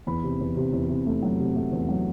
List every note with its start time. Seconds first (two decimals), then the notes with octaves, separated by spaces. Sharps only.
0.07 E2 B5
0.24 C3
0.40 E2
0.56 C3
0.73 E2
0.89 C3
1.06 A3
1.23 F#3
1.39 C3
1.56 A3
1.72 E2
1.89 F#3